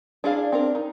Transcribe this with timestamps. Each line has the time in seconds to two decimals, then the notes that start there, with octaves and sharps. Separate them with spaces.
0.24 D4 E4 G#4 D5 F5
0.52 C4 D4 A#4
0.75 D#4